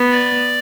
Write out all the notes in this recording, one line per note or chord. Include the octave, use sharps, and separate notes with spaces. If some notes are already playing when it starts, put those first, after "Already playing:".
Already playing: B3
D5